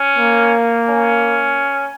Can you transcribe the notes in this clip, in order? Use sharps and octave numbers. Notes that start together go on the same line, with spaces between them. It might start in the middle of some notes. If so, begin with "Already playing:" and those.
Already playing: C#4
A#3
C#4